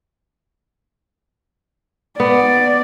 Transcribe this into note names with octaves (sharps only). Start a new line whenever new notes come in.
B3 D5